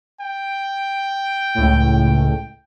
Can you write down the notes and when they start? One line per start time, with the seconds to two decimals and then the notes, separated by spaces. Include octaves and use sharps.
0.20 G5
1.55 C#2 A2